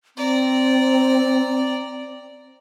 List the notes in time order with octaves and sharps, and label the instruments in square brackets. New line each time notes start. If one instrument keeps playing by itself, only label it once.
[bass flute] C4 [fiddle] D5 A#5